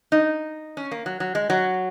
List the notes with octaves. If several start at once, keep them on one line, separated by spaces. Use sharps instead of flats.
D#4
C#4
A#3
F#3
F#3
G#3
F#3